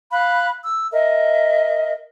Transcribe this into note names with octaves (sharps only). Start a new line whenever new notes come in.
F5 B5 F#6
E6
A#4 D#5 E5